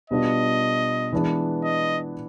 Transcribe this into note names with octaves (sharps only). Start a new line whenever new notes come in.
B2 G3 B3 D4 F4 D#5
E3 G#3 B3 D4
D#5